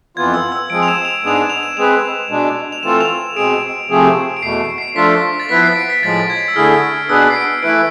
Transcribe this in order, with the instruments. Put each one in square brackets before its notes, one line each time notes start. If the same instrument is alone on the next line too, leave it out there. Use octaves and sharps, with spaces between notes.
[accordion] F2 E3 B3 F4 [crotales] G#6
[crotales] E6
E6
[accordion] F3 G#3 C4 G#4 [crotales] D7
[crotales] F7
E7
F7
[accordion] G#2 G#3 B3 D4 G#4 [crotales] F7
[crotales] E7
F7
E7
[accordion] G#3 C4 G#4 B4 [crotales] F7
[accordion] B2 G#3 D4
[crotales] F7
[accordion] E3 A3 C4 F4 A4 [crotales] E7
[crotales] F7
[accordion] B2 G#3 C4 G#4 [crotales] D7
[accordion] C3 F3 A3 C4 G#4
[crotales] D7
[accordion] E2 B2 A3 [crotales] C7
[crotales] C7
[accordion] F3 A3 D4 F4 A4 [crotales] B6
[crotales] A6
[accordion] F3 B3 E4 B4 [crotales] B6
[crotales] C7
D7
B6
[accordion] A2 F3 G#3 [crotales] A6
[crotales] G#6
E6
[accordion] D3 A3 E4 G#4 [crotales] F6
[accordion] B2 B3 D4 G#4 B4 [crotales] E6
[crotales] C7
D7
[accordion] E3 A3 E4 B4 [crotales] D7